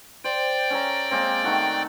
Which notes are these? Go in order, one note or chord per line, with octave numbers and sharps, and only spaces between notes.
C5 D5 G5
C#4 A4 A#5
G#3 A#3 C4
D#3 A3 F#4